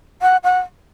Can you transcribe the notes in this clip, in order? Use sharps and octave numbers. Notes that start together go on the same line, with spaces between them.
F#5
F#5